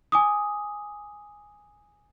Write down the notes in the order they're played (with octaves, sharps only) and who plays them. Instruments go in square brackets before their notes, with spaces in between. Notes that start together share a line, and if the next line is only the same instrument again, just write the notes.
[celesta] G#5 D6 D#6